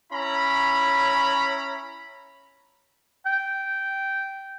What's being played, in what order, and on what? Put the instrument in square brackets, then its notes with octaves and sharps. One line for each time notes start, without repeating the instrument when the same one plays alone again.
[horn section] C#4 E4 A#5 B5
[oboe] G5